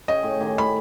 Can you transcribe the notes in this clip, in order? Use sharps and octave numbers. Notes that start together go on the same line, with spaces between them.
C#3 C#5 D#5 G5
A2
D#3 G4 G#5
A2 B5